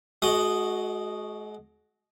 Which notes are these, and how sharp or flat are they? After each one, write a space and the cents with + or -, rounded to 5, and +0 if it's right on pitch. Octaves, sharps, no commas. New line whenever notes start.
G#3 +40 F#4 +0 D#5 -5